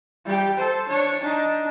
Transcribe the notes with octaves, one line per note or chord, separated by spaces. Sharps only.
G3 G4
A4 C5
D4 C#5
D4 D#4